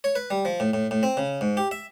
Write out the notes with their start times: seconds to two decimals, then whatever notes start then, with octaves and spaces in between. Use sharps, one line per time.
0.04 C#5
0.16 B4
0.30 G3
0.45 F3
0.60 A2
0.74 A2
0.91 A2
1.03 C4
1.17 C#3
1.41 G#2
1.57 G4
1.71 E5